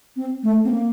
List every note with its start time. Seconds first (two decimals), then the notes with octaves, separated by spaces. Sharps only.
0.16 C4
0.43 A3
0.65 C4
0.71 A#3